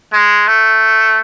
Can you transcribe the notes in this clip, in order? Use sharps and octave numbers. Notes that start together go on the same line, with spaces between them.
G#3
A3